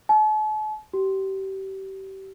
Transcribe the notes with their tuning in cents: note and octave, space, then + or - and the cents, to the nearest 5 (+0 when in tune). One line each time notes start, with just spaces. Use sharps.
A5 -45
G4 -30